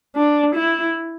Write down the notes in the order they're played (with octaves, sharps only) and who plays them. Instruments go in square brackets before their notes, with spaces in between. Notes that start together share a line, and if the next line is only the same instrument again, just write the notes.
[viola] D4
E4